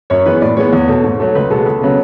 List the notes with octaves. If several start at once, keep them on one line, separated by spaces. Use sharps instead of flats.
F#2 C#5
E3 G#3 B3 B4
A2 D5
E3 G#3 B3 C#5
E2
B2 A3
G#2
F#3 A3
C#2 B4
B2 G#3 B3 A4
C#2
C#3 F#3 B3